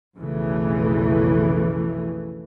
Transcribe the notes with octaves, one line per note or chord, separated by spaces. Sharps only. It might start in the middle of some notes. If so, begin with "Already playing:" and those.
B1 F2 C#3 E3 A3